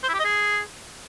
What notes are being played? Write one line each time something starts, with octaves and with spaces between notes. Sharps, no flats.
C5
E4
G4
D#5
G#4